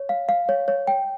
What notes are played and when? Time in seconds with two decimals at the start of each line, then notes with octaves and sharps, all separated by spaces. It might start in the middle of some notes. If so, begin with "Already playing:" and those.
Already playing: C#5
0.09 F5
0.29 F5
0.49 C#5
0.68 C#5
0.87 G5